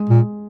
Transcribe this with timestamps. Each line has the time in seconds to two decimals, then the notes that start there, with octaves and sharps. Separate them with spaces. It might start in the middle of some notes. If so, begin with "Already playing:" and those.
Already playing: G#3
0.10 A#2